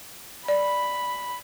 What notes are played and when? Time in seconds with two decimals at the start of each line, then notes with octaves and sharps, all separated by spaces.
0.48 D5 B5